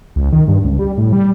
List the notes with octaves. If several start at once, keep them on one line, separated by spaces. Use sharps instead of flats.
C#2
D#3
G2
C#2
G3
A2
G3